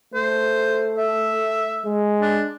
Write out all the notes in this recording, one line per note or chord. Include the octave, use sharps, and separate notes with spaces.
A3 C5
E5
G#3
D4